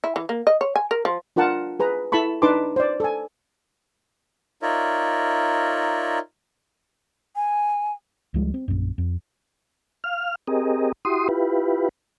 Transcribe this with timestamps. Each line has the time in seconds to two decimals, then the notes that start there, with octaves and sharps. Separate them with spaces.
0.04 E4
0.16 E3
0.29 A#3
0.47 D#5
0.61 C#5
0.76 G#5
0.91 A#4
1.05 F3
1.36 D4 F4 A#4 F#5 A5
1.80 G#4 B4 A#5
2.12 E4 A4 A5 B5 C#6
2.42 D4 D#4 B4 A5 C6 D6
2.76 C5 D5
3.00 A4 G#5
4.62 D#4 F4 A#4 C#5 D5 E5
7.36 G#5
8.34 C#2 F3 G3 G#3
8.54 C4
8.68 A#1 F#2
8.98 F2
10.04 F5 F6
10.47 C4 G4 G#4 A#4 D#5
11.05 E4 F#4 G4 C6 D#6
11.29 E4 F4 G4 B4